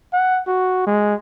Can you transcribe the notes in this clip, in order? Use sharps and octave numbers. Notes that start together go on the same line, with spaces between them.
F#5
F#4
G#3